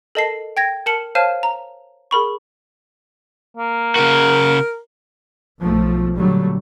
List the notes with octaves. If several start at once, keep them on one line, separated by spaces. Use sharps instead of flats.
A4 A#4 D#5 A5 A#6 C7
G5 G#6 A#6
A#4 A5 F6 C#7 F#7
C5 C#5 F5 A5 F6 D#7
A#5
G#4 A#4 B5 C#6
A#3
C#3 F#4 A#4
B1 F3 A3
A#2 D3 F#3 G3 A3